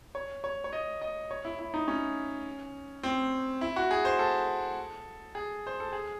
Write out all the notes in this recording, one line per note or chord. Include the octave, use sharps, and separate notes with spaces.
C#5
C#5
C#5
D#5
D#5
C#5
E4
E4
D#4
C#4
C4
E4
F#4
G#4
C5
A4
G#4
C5
A4
G#4